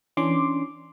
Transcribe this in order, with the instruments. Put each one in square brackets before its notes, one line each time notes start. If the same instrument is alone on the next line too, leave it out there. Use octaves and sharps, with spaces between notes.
[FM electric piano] E3 C#4 D4 C6 D6